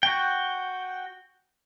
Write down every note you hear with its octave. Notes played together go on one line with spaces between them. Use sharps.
F#4 G5